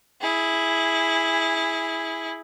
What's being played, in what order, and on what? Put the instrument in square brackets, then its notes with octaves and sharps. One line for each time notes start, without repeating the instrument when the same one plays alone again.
[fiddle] E4 G#4